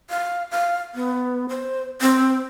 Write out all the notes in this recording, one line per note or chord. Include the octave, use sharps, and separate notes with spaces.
F5
F5
B3
C5
C4